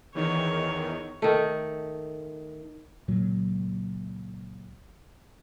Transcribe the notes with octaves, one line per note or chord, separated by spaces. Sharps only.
E2 D#3 C#5
D#3 A3
C#2 A#2 F#3